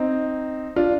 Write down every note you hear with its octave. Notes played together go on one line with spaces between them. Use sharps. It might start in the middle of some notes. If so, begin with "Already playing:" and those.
Already playing: C4 D#4
D4 F4